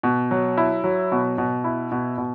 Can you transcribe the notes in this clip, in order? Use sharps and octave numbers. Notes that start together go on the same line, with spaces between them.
B2
F#3
E4
F#3
B2
B2
E4
B2
B2